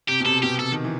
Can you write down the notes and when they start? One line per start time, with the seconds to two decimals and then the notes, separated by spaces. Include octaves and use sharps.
0.08 C3 G4
0.20 B2
0.25 C3 A4
0.43 B2 G4
0.59 C3 A4
0.72 D#3
0.84 E3